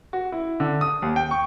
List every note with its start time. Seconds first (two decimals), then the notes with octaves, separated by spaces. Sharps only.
0.13 F#4
0.32 E4
0.60 D3
0.81 D#6
1.02 D#2
1.16 G5
1.31 C#6